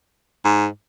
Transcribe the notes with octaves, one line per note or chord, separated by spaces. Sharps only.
G#2